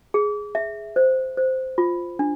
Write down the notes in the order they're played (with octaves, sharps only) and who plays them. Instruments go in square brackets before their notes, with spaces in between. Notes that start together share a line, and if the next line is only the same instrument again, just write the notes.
[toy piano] G#4
E5
C5
C5
F4
D4